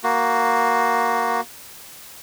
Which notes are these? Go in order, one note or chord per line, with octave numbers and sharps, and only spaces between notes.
A#3 F#4